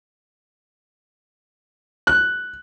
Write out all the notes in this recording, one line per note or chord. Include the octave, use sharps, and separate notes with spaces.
F#6